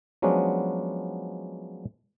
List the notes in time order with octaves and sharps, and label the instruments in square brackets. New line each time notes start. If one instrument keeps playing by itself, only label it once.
[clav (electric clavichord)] F3 F#3 G#3 B3 C#4 D4